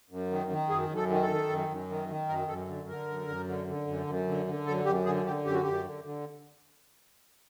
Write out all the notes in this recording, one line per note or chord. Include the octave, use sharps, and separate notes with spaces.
F#2
D#3
D#3
F#2 G#4
F#2
A4
D#3
A4
D#3
F#2
F#2
D#3
D#3
F#2 A#4
F#2 A4
D3
D3 A#4
F#2
F#2
D3
D3
F#2
F#2
D3
D3
F#2 A4
F#2 G4
D3 G#4
D3 G4
F#2 G4
F#4
F#2 G4
D3
D3